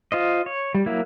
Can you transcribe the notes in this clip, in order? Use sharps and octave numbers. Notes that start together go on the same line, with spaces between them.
F4 C5 D#5
C#5
G3
F#3 A#3 E4